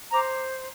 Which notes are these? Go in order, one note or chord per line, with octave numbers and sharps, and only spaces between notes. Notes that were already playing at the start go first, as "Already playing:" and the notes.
C5 A#5 D6